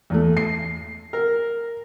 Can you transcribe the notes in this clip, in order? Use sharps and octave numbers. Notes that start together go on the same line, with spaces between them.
E2 A3
C7
A#4